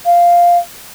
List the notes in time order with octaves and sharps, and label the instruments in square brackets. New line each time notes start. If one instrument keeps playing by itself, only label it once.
[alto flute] F5